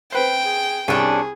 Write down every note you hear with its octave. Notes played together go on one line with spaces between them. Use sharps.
C4 B4 C5 G5
G#4
C2 C3 C#4 D4 G#4